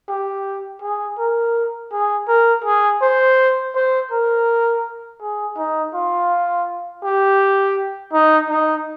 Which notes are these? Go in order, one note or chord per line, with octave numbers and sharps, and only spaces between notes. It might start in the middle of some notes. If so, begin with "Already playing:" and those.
G4
G#4
A#4
G#4
A#4
G#4
C5
C5
A#4
G#4
D#4
F4
G4
D#4
D#4